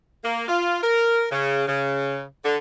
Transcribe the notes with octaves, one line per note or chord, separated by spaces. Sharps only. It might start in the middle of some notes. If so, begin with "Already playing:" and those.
A#3
F4
A#4
C#3
C#3
D3